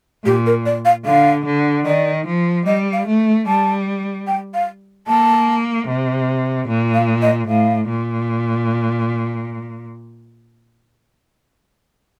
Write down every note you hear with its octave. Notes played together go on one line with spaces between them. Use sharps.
A#2 G4
A#4
D5
F5
D3 F5
D3
D#3 D5
F3
G3 D#5
F5
A3
G3 A5
G5
F5
A#3 A5
C3
A#2
F5
D#5
A2 F5
A#2